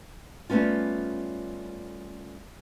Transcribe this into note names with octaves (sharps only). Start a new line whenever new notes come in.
G3 A3 B3 C#4 F4